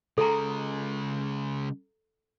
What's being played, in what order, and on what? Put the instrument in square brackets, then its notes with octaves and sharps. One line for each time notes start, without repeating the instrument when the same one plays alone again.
[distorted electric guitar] C#3 G#3 [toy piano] A4 A#5